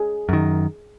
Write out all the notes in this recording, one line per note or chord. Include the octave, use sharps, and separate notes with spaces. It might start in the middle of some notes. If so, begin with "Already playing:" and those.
Already playing: G#4
F#2 D#3